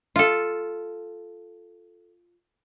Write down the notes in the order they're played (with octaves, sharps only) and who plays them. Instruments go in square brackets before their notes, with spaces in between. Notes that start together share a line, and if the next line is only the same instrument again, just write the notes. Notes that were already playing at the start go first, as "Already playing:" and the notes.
[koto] F4 A4